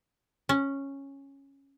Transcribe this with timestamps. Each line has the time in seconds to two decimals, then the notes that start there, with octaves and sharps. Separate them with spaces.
0.49 C#4